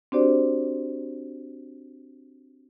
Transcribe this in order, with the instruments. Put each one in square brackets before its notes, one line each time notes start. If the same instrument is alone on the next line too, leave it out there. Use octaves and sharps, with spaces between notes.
[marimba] C4 D4 F#4 G4 C5 D5